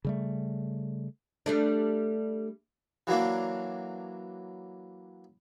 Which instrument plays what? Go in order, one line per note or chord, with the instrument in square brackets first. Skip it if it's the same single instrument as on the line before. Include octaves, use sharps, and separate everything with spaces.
[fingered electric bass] C#3 G3 A3
[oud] G3 A3 D4
[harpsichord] E3 F#3 A#3 D4